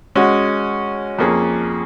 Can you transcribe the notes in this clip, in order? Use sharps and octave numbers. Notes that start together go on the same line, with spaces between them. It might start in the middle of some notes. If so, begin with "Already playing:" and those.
G#3 C#4 F#4
F2 F3 A#3 C#4 G#4